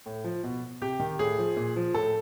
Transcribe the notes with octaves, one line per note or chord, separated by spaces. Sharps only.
A2
F3
B2
C3 G4
D#3
A2 G#4
F3
A#2
F3
A2 A4